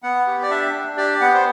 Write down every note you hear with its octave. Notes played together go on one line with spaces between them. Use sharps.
B3 F#5
G4
D5
D4 E5
D4
G4 D5
B3 F#5
C5